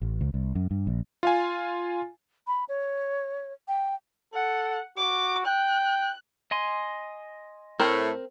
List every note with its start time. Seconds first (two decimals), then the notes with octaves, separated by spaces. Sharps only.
0.02 A1
0.21 C#2
0.34 C2
0.55 F#2
0.71 G2
0.87 A#1
1.23 F4 F5 G#5
2.47 B5
2.69 C#5
3.68 G5
4.34 A4 F#5
4.97 F#4 D6
5.46 G5 F#6
6.51 D#5 G#5 C6
7.80 A2 A3 C4 A#4